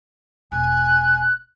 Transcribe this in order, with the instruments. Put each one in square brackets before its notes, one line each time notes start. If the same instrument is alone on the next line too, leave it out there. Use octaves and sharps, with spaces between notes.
[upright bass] E1 [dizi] G#5 [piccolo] F#6